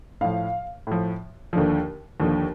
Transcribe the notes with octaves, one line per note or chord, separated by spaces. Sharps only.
A2 F3 F5
A2 F3
D#2 D3 F3
D#2 D3 F3